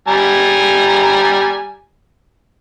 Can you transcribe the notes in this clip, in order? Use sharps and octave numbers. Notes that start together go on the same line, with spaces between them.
G3 G#5 A#5